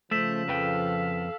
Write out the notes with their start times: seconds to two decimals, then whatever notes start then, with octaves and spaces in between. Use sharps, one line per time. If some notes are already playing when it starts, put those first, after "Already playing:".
0.11 C#3 F3 A3 C5 E6 B6 E7
0.48 F2 A4 B4 F5 G5